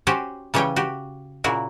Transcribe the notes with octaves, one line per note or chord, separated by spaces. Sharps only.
C#4 F#4 G4 C5
C#3 E3 G3 C#4 C#5 G5
F#4 G4
A#2 C#3 E4 F#4 A#4